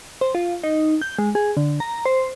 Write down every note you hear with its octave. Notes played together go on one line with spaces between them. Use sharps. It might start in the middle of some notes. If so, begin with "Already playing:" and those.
C5
F4
D#4
G6
G#3
G#4
D3
A#5
C5